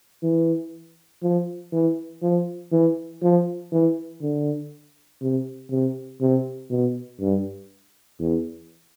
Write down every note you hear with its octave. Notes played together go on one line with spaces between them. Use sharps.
E3
F3
E3
F3
E3
F3
E3
D3
C3
C3
C3
B2
G2
E2